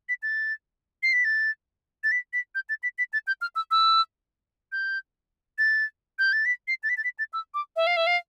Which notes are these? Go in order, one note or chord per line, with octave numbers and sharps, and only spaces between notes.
B6
A6
C7
B6
A6
A6
B6
B6
G6
A6
B6
B6
A6
G6
F6
E6
E6
G6
A6
G6
A6
B6
C7
A6
B6
A6
B6
A6
E6
D6
E5
F5
E5
F5